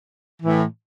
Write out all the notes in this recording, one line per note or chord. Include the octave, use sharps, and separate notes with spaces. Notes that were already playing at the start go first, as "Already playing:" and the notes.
A2 E3